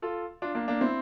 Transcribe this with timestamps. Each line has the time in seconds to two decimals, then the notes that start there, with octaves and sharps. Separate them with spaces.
0.02 F4 A4
0.42 D4 F4
0.55 A#3 D4
0.68 A#3 D4
0.81 C4 E4